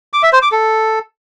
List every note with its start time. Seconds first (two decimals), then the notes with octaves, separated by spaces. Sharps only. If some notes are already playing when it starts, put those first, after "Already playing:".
0.13 D6
0.23 E5
0.33 C5
0.42 D6
0.52 A4